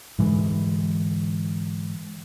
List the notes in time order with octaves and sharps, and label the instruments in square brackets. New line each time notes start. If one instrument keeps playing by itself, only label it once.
[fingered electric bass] G#2 D3 E3 G#3